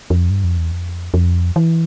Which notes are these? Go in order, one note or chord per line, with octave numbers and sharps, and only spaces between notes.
F2
G2
F2
E2
F2
F2
E3